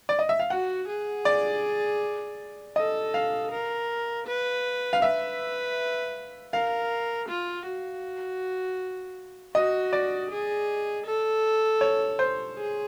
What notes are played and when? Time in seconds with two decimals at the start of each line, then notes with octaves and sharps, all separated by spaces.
0.09 D5
0.19 D#5
0.29 E5
0.39 F5
0.50 F#4 F#5
0.87 G#4
1.25 D5
2.76 A4 D#5
3.14 F5
3.51 A#4
4.27 B4
4.93 F5
5.02 B4 E5
6.53 A#4 F5
7.29 F4
7.66 F#4
9.54 F#4 D#5
9.93 D5
10.31 G#4
11.06 A4
11.81 C#5
12.19 C5
12.57 G#4